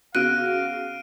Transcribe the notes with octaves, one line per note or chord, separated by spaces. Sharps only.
C#3 B3 F#4 F5 F6 F#6 D7 D#7